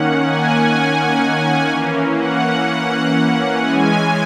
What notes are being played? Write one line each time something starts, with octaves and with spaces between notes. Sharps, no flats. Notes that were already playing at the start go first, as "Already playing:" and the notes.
Already playing: D#3 A#3 C#4 F#5
G#5
G#5
E3 A#3 C#4
F#5
E3 G#3 C#4 G#5